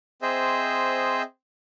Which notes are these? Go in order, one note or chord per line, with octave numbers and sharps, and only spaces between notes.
C4 G#4 C5 D#5 E5